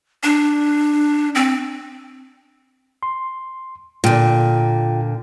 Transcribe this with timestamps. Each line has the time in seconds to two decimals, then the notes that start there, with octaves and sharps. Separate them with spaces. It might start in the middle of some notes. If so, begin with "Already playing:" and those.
0.23 D4
1.35 C4
3.03 C6
4.04 A#2 D3 F4 G5